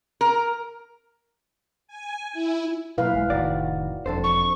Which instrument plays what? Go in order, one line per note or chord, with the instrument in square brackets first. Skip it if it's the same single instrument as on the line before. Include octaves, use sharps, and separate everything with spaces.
[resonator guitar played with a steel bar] A#4
[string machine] G#5
E4
[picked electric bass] B2 F#3 A#3 [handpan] E4 B4 F5
[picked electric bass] D#1 A#1 G#3
[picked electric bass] F1 A2 D#3 [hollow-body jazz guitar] F#4 D5
[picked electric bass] E1 D4 [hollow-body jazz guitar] F2 A4 C5
[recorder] C#6